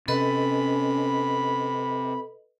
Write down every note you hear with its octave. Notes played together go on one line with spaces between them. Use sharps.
C3 C#4 A4 B4 D#5 B5